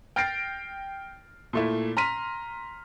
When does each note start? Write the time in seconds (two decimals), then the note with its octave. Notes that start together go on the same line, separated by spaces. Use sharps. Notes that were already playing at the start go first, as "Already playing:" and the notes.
0.16 G5 F6 A6 A#6 C7 D7
1.53 A#2 A3 E4
1.97 A#5 C6 F6 B6 D#7